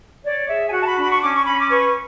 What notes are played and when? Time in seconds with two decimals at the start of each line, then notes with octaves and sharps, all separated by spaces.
0.23 C#5 D5
0.47 G#4 E5
0.67 G#5
0.71 F#4 F#5
0.80 A5
0.85 B5
0.97 D4 B5
1.09 C#6
1.21 C#4 D6
1.34 C#6
1.45 C#4 B5
1.57 D6
1.70 B4 C#6